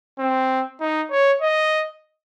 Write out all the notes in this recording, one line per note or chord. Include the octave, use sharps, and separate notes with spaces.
C4
D#4
C#5
D#5